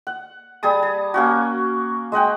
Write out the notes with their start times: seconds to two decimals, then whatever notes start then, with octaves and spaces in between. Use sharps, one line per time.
0.07 F#5
0.63 G3 G#4 A5 D#6
0.83 A5
1.14 A#3 C#4 F#4
2.12 G#3 D#5 F#5 G5